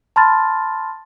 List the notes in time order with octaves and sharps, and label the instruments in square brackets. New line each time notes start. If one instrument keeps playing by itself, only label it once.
[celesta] A5 B5 C6 F6 A6